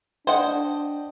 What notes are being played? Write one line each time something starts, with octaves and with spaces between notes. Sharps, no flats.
D4 C5 D5 D#5 F#5 G5